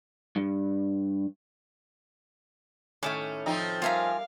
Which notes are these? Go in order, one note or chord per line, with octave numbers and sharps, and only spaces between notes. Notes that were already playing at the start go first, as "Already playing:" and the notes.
G2
A2 D#3 A3 C#4 E5 D6
F3 C4 D#4
G3 F4 A#4 E5 F5 G#5 A#5